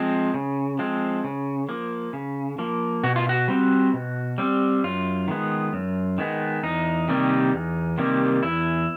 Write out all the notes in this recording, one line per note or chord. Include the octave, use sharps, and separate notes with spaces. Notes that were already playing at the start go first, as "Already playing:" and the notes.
Already playing: F3 G#3 C4
C#3
F3 G#3 C4
C#3
F3 A#3
C#3
F3 A#3
B2 F#4
F4
F#4
G3 C4
B2
G3 C4
F#2 F4
D#3 G#3 B3
F#2
D#3 G#3 B3
E2 D#4
C3 D#3 G3 A#3
E2
C3 D#3 G3 A#3
E2 E4